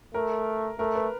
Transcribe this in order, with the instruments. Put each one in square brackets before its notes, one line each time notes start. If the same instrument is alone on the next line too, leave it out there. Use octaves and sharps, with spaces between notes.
[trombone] A3 [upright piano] A#4
[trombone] A3 [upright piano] A#4
[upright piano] B4